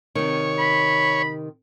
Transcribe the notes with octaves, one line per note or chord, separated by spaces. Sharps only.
C3 D#3 C#5
B5